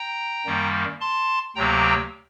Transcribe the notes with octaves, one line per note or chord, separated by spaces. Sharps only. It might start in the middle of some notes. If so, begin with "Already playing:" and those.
Already playing: G5 A#5
F#2 D#3 G3 A#3
A5 C6
D2 C3 F#3 A#3 G5 A#5